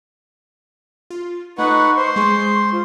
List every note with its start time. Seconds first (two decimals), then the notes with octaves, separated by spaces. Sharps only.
1.10 F4
1.58 A3 D#4 B4 F#5 C#6
1.97 C5 C6
2.16 G#3 G#4 C#6
2.72 F4